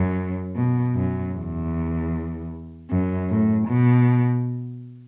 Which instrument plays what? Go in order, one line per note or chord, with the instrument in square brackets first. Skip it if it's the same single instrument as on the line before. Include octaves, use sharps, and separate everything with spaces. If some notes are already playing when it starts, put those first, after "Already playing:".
Already playing: [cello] F#2
B2
F#2
E2
F#2
A2
B2